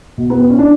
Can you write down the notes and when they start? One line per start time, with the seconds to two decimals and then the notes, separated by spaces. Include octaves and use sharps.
0.18 B2
0.30 B3
0.39 C4
0.50 C#4
0.59 D4